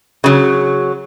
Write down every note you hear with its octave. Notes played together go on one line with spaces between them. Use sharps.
C#3 F#3